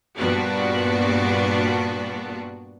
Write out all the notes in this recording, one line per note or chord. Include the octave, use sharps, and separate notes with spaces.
G2 A#2 G3 B3 D4 F#4